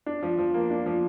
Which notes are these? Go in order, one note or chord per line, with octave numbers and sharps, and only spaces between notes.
D4
F3
F3
A#3
D4
F3